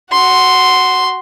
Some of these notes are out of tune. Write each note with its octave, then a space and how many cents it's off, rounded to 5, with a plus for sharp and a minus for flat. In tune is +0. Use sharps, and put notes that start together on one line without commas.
F#4 +0 C6 +0